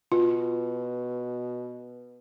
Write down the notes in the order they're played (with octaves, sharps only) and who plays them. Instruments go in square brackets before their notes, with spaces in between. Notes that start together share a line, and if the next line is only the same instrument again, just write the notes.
[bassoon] B2 [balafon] F4